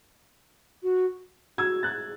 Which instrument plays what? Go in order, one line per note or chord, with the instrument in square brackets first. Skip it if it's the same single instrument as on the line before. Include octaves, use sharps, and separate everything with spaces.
[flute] F#4
[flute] F#4 [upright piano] E6 G#6
[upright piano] F#6 A6